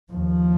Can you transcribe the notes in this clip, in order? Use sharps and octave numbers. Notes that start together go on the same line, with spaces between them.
D#2 F3